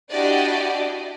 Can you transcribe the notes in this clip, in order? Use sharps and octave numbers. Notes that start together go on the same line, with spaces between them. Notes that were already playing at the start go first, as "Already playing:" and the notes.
D4 E4 F#4 G4 D5 D#5